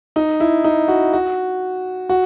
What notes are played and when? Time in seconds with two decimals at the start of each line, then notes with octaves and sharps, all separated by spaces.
0.16 D#4
0.40 E4
0.64 D#4
0.88 F#4
1.13 F#4
2.09 F#4